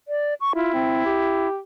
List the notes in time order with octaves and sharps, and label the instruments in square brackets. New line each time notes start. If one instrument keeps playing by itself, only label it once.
[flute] D5
C#6
[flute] E4 [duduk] F4
[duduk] C4
G4